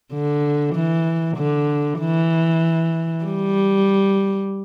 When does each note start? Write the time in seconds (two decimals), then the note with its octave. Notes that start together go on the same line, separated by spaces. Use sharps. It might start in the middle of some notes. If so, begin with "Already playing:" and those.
0.13 D3
0.75 E3
1.37 D3
2.00 E3
3.24 G3